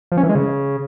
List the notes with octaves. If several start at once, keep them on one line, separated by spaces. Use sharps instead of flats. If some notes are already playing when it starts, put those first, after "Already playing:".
F3
C#4
E3
G#3
C#3